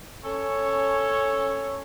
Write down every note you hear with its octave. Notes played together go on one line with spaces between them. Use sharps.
C#4 A4 C#5